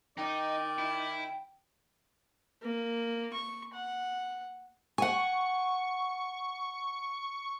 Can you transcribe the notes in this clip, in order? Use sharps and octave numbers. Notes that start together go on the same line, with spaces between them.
D#3 D#4 D5 G5
E4
A#3
C#6
F#5
F#5 G#5 C#6